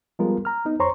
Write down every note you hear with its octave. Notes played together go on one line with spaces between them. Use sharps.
F3 G3 G#3 B3 F4 A#4
A#5 F6
B3 D#4
F2 C5 C#5 A#5 C6 C#6